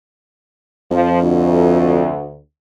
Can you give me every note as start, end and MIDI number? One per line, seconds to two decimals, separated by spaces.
0.91 2.10 41
0.91 1.22 53
1.22 2.36 38